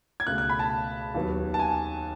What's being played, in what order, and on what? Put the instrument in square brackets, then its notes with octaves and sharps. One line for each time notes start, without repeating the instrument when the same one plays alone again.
[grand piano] G#6
C#2 B2 A3 F#6
F#6
B5
A5
D#2 D#3 F#3 B3
A5
G#5